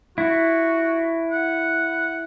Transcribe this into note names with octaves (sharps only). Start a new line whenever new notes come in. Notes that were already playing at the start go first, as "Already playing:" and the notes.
E4 F#4
F#5